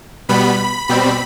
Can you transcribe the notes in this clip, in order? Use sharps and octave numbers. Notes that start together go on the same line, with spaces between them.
B2 G3 B3 B5
B2 G3 C4 B5